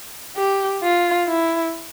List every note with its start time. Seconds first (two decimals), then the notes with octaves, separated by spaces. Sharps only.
0.37 G4
0.82 F4
1.28 E4